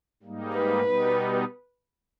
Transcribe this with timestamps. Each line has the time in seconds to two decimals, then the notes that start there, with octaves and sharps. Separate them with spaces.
0.23 G#2 G3 A#3 D#4
0.54 B4
0.84 B2 G3 B3 D#4